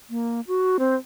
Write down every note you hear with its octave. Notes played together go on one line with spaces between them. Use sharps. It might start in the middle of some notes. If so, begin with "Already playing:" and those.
A#3
F#4
C4